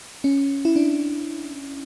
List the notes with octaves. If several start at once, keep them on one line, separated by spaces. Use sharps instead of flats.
C#4
E4
D4